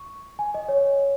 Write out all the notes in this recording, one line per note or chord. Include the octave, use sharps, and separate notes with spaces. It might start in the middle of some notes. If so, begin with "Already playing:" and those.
Already playing: C#6
G#5
D#5
C#5